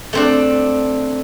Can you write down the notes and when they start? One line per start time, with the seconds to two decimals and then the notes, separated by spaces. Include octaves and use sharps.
0.13 A3 C4 D4